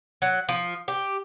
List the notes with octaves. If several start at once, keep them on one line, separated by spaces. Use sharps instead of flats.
F#3
F3
G4